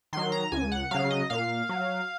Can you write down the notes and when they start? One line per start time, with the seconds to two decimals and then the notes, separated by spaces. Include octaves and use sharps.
0.13 D#3 F#3 C6
0.32 A#5
0.52 C#2 G#5
0.72 F#5
0.91 C#3 F#3 F5
1.10 D#5
1.30 A#2 F5
1.69 F#3